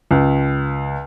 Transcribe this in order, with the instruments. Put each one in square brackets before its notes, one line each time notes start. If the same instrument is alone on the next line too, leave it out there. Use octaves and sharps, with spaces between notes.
[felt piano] C#2